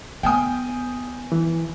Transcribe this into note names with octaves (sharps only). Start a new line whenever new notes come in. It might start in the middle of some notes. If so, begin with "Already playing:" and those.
B3 G5 G#5 D#6
E3